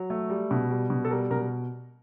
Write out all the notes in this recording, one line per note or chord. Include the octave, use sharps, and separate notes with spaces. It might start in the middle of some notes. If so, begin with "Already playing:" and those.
Already playing: F#3
A3
G3
B2
G3
B2
A4
G3 A#4
B2 A#4